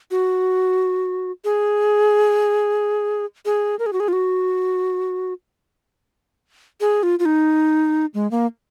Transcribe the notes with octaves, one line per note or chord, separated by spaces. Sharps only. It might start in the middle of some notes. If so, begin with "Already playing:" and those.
F#4
G#4
G#4
A#4
G#4
F#4
G#4
F4
F#4
G#4
F4
F4
D#4
G#3
A#3